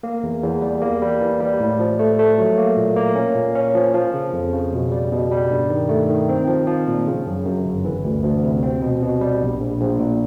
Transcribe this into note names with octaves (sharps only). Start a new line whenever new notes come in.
A#3
E2
E2
G3
A#3
G3
E3
G3
A2
F3
A3
A3
F#3
A#3
A#2
A#3
C#4
A#2
C#4
F3
F3
C#3
F2
C#3
B2
G3
B2
G3
G2
D#3
A3
D#3
C4
F3
F3
A#2
C#3
F#2
F#2
G1
E3
D2
D2
C3
C4
B2
B2
G3
A#1
A#1
A#1
A#2